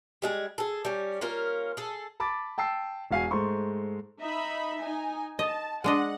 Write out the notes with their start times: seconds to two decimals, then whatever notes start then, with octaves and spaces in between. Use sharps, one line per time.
0.22 G3 G#3 G#4
0.58 G#4 A4
0.85 G3 C#4
1.21 A#3 C#4 F4 A#4
1.77 G#4 A4
2.20 A5 B5 D6 A6
2.58 G5 A5 E6 C7
3.11 E1 F#4 F5 G#5 C7
3.31 G#2 G#3 A3 C5 C6 C#6
4.20 D#4 E5 B5
4.80 D#4 G#5
5.39 D#5 A5
5.84 G#3 D4 D#5 F#5